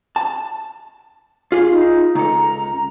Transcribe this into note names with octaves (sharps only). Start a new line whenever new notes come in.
A5
F4 G#4
D#4
C#2 A4 A#5